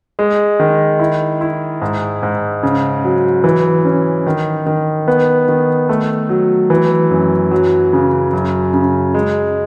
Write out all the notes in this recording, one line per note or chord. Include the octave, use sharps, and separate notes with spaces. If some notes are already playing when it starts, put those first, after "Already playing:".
G#3
D#3
E4
E4
G#2
G#2
C#3
F#3
E3
C#4
D#3
D#3
B3
D#3
A3
F#3
E3
F#2
F#3
C#3
F#2
C#3
G#3